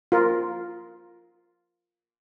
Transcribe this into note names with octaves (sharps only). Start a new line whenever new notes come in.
F4 A#4